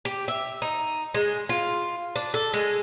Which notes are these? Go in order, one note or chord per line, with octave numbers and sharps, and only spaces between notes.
G4
E5
D#4
G#3
F4
D4
A4
G#3